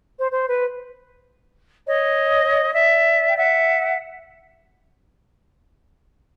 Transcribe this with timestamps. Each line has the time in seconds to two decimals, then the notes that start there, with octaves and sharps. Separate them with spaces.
0.17 C5
0.32 C5
0.48 B4
1.87 C#5 D#5
2.72 D5 E5
3.27 G5
3.36 E5 F#5